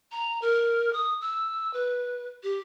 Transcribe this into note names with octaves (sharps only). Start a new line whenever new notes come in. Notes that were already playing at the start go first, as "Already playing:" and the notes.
A#5
A#4
D#6
E6
B4
G4